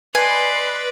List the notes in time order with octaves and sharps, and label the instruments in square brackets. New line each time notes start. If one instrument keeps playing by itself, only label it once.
[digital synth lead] B4 [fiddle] D5 D#5 [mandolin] G#5 [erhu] C6